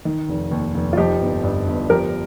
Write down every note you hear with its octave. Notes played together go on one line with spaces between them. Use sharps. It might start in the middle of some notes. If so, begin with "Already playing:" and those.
D#3
F1
D#2
F1
F4
F3 D#4 G4
G1
G2
G1
F3 G4 A#4